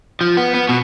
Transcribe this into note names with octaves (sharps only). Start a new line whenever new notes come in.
F3
B3
B3
B2